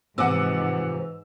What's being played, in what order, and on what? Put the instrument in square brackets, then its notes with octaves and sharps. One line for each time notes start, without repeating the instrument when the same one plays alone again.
[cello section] G#2 [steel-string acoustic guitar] C3 F3 [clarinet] E3 [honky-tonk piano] F#5 D6 E6